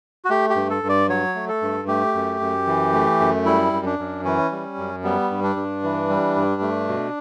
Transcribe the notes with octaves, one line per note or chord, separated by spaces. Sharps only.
F#4
A3 G4
G4
G2
A4
G2
D5
F#3 C#5
A3
A4
G2
A3 G4
F#2
F#2
E3
A3
F#2
G3 E4
F#2
D4
F#2
E3 C#4
G3
F#2
G3 B3
G2
D4
G2
E3
G3
G2
A3
B2